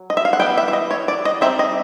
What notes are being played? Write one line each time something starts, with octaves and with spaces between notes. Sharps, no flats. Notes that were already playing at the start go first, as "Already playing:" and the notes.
Already playing: F#3
D#5
E5
F5
F#5
E3 G3 B3 G5
E5
E5
D#5
C#5
D5
D#5
G3 C4 D#4 E5
D#5